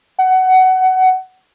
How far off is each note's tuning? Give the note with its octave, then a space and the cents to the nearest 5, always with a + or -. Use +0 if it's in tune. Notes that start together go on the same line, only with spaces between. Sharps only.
F#5 +15